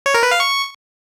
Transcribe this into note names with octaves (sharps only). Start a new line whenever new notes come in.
C#5
A#4
B4
F5
C#6